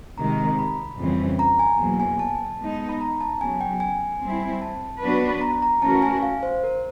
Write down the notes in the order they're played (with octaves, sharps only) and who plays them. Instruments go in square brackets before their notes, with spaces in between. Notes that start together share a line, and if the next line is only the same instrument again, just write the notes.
[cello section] C3 D#3 G#3 [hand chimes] A#5
[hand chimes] A#5
B5
[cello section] F2 C#3 E3 G3 C4
[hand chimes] A#5
G#5
[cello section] E2 B2 F#3 A#3
[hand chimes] G#5
A5
[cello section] G#3 B3 D#4
[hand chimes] B5
A#5
A5
[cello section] C#3 F#3 B3 [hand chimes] G#5
[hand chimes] G5
G#5
[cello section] G3 C4 E4
[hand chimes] A5
[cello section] F#3 B3 D4 F#4 B4
[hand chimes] A#5
A#5
[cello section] E3 A3 C#4 F#4 A#4 [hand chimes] A5
[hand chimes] G#5
F5
C5
A#4